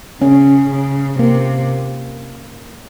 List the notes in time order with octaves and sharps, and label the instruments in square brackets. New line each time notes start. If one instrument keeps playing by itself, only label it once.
[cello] C#3 [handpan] C#4
[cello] C#3
[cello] C3 [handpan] A#3